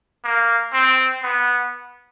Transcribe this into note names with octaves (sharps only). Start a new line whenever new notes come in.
A#3
C4
B3